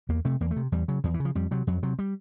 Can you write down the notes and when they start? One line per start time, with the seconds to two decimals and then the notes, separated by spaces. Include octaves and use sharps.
0.09 E2 A#3
0.25 C3 A3
0.40 E2 A#3
0.51 A3
0.56 C3
0.72 E2 G3
0.88 C#3 F#3
1.04 E2 F3
1.14 E3
1.20 C#3
1.25 F3
1.35 F2 G3
1.51 C3 F#3
1.67 F2 F#3
1.83 C3 F#3
1.99 G3